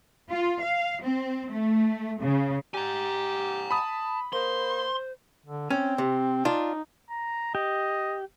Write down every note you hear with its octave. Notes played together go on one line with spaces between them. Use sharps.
F4
F5
C4
A3
C#3
G4 G#5 A#5
A5 B5 D#6
A#3 C5 C6
D3
C4 C#4
C3
D4 D#4 F4
A#5
G4 D#5